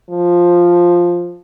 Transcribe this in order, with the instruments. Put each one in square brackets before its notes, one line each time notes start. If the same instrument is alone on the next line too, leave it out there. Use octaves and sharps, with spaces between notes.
[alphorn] F3